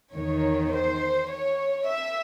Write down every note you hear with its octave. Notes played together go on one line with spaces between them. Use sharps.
E2 D#3 C#5
C5
C#5
E5